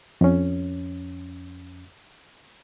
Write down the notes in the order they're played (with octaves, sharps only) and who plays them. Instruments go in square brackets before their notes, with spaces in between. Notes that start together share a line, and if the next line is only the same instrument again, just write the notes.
[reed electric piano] F2 C#4